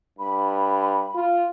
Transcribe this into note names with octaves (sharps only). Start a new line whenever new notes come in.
G2 B5
F4